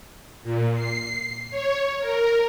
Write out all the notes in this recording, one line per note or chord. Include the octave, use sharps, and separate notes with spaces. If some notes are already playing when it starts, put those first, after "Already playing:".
A#2
C7
C#5
A#4